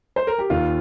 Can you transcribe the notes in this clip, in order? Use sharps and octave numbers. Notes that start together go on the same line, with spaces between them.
C5
A#4
G4
D#2 F4